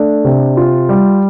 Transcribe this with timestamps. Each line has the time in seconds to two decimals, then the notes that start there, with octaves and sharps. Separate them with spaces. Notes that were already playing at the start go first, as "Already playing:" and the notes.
Already playing: A3 D4
0.25 C3
0.57 F4
0.89 G3